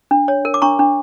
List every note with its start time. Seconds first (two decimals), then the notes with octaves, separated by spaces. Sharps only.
0.11 D4
0.28 C#5
0.45 A#4
0.54 D6
0.62 D4 A#5 C#6
0.79 D4